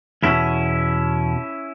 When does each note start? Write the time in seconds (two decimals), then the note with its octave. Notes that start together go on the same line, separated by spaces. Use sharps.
0.23 E2 B2 C#4 E4